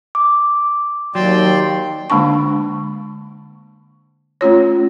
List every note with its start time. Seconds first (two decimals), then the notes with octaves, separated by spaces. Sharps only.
0.15 D6
1.15 D#2 F#3 D5 G5 C6
2.10 D3 G#3 A#3 D4 A5 C#6
4.41 A3 C#4 F4 C#5